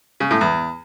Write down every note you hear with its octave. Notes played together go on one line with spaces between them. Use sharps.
C#3
A2
E2